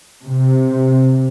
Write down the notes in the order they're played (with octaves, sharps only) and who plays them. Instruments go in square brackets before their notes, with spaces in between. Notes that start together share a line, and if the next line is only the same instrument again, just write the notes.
[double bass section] C3